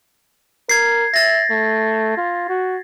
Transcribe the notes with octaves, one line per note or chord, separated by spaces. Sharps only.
A#4 G#6 C7
E5 A6 A#6
A3
F4
F#4